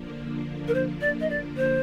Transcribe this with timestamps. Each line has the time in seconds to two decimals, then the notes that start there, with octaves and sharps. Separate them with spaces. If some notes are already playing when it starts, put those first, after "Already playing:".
Already playing: D3 F3 A#3 D4
0.67 A#4
0.74 C5
1.01 D5
1.20 D#5
1.29 D5
1.57 C5